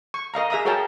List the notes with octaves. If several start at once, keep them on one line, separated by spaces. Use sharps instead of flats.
C#6
A#4 D#5 F5 A#5
G#4 E5 A#5 D#6
F#4 G#4 A#4 C#5 G5 A5